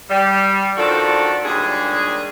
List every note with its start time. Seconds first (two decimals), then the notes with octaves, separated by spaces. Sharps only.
0.10 G3
0.77 D#3 F3 D4 F#4 A4
1.45 D#2 A#2 G3 G#3 D4 G#4